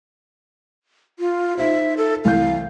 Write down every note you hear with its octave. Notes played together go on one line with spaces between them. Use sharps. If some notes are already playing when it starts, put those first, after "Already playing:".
F4
D#4 F4 C5 E5
A4
C2 E3 F5 G6